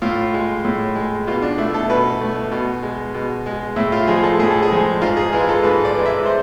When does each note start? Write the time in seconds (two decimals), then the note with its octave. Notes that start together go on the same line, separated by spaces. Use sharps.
0.02 A2 F4
0.34 G#3
0.65 A2
0.95 G#3
1.27 B2 F4
1.42 D4
1.58 A3 E4
1.74 A4
1.90 B2 B4
2.21 A3
2.52 B2
2.83 G#3
3.14 B2
3.46 G#3
3.76 A2 E4
3.92 F4
4.07 F3 G#3 G#4
4.24 A4
4.39 A2 G#4
4.51 A4
4.62 G#4
4.70 F3 G#3
5.01 G#2 F4
5.17 G#4
5.33 E3 G#3 F4
5.49 A4
5.63 G#2 B4
5.85 D5
5.96 E3 G#3
6.06 E5
6.26 C5